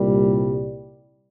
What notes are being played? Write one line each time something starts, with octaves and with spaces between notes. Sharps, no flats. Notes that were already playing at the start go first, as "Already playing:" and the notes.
Already playing: C2 A#2 G3